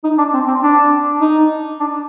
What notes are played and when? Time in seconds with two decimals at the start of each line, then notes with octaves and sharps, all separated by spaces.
0.04 D#4
0.18 D4
0.34 C4
0.48 C4
0.63 D4
1.21 D#4
1.80 D4